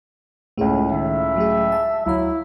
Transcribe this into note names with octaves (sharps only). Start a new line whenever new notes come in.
C#2 A2 A3 G#4
D#3 E5
F#3 A3 G#4
A5
D2 F#3 E4 F5